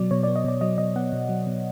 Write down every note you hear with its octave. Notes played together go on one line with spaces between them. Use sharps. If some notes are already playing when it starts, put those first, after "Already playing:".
Already playing: B2 F#3 B3 D5
B2 C#5
D5
B3
D#5
B2 D5
F#3 D#5
B2 D#5
B3 F#5
B2
F#3
B2